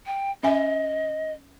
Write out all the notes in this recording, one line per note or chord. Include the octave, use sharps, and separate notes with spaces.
G5
C#4 D#5 E5 G#5